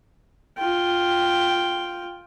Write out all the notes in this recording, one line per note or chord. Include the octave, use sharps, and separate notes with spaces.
F4 G5